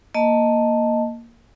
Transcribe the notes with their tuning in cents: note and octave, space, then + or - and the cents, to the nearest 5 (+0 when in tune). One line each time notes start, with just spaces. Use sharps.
A#3 +0 D#5 +0 A5 +0